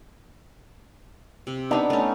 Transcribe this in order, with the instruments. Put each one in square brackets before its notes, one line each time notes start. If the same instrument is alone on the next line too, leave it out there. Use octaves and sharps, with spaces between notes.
[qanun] C3
[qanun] B3 D#4 [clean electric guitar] D4
[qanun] A3 C#4